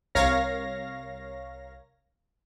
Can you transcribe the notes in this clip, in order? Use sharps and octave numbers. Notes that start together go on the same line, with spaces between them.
C2 A#4 C#5 F5 A#6